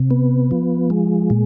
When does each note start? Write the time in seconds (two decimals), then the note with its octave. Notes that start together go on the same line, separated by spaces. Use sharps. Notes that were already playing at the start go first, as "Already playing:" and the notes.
Already playing: C3
0.11 B3
0.51 F3
0.90 G#3
1.30 A#2